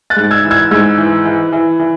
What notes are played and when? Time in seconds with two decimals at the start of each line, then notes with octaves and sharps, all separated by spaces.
0.10 F#6 A6
0.17 G#2
0.31 E6 G#6
0.45 E3
0.51 E6 G#6
0.71 G#2 E6 G#6
0.98 E3
1.25 E3
1.53 E3
1.80 E3